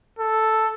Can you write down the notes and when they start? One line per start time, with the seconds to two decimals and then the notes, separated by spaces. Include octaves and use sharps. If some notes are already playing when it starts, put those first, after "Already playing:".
0.19 A4